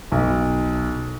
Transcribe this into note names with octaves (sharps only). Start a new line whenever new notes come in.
B1